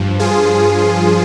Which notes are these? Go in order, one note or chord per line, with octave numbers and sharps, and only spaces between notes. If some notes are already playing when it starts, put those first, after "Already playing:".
Already playing: G2 F3
F4 G#4